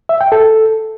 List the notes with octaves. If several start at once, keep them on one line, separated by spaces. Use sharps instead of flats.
E5
G5
A4